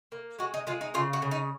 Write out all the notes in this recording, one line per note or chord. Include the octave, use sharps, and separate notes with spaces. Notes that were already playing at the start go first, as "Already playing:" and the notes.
A#3
G#3 F#4
D#4
G#3 F4
D#4
C#3 F4
F#4
C#3
D#4